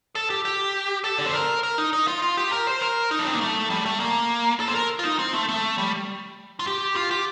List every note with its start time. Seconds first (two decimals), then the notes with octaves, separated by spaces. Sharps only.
0.15 A4
0.30 G4
0.45 G4
1.04 A4
1.18 D5
1.26 C5
1.33 A#4
1.63 A#4
1.78 D#4
1.93 D#4
2.08 F4
2.22 F4
2.37 G4
2.52 A#4
2.67 C5
2.82 A#4
3.11 D#4
3.19 D4
3.27 C4
3.33 A#3
3.41 A3
3.70 G3
3.86 A3
4.00 A#3
4.60 A4
4.68 C5
4.75 A#4
4.99 F4
5.04 D#4
5.19 C4
5.33 A3
5.49 A3
5.78 G3
6.60 F4
6.67 G4
6.96 F4
7.11 G4